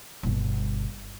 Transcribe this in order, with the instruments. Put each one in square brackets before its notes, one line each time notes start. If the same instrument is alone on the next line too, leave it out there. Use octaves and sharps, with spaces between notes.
[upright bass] G1 B2